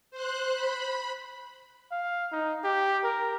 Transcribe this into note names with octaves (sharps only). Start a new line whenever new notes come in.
C5 F#6
B5
F5
D#4
G4
A#4